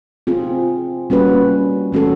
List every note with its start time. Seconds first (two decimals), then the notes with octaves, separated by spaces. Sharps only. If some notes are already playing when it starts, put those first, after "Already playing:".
0.27 C4 F4 G#4
1.10 G3 A#3 C#4 F#4 B4
1.92 E3 A3 C#4 F#4 A4